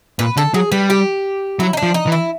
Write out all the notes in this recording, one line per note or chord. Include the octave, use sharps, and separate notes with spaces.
A#2 B4
D3 A4
F#3 G#4
G3 B4
G4
F#3 E4
D#4
D4
F3
D#4
E3
E4